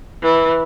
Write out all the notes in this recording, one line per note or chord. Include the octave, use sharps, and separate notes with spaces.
E3